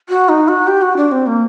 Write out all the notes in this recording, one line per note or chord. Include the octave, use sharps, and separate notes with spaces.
F#4
D#4
F#4
G4
F#4
D4
C4
A#3